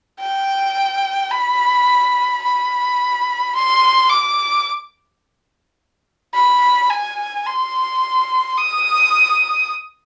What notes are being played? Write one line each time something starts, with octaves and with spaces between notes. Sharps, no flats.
G5
B5
B5
C6
D6
B5
G#5
C6
D#6